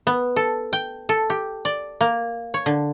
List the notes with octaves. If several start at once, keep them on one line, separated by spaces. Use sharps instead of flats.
B3
A4
G5
A4
G4
D5
A#3
C#5
D3